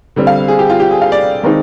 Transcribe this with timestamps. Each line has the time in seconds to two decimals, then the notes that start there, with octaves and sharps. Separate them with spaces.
0.16 D3 G3 C4
0.27 F5
0.48 G#4
0.59 G4
0.70 F4
0.80 G4
0.91 G#4
1.01 F5
1.12 D5
1.44 D#3 G#3 C4 D#4